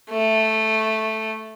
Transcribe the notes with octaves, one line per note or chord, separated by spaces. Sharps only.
A3